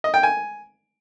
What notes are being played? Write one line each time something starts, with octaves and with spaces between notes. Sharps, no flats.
D#5
G5
G#5